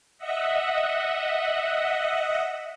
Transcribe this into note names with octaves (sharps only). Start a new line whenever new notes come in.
D#5 E5 F#5